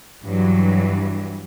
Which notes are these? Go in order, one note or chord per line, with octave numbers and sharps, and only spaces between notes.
G2 E3 F#3